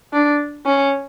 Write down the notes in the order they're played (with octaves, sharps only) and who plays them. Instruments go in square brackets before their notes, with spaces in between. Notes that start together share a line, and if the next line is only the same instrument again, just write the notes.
[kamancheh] D4
C#4